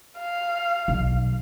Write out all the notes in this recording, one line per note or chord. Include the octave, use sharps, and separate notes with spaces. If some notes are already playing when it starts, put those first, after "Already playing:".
F5
B1